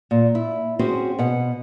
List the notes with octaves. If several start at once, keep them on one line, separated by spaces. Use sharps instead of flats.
A#2
E4
C4 C#4 F#4 G#4 C5
B2 F#5